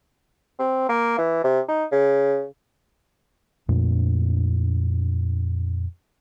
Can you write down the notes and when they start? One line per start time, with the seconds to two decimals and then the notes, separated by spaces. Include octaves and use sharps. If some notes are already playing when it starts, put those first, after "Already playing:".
0.59 C4
0.89 A#3
1.18 E3
1.44 C3
1.68 D#4
1.91 C#3
3.69 F2 A#2 A3 D4